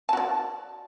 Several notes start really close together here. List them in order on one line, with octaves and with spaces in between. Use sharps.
A5 F#4 D5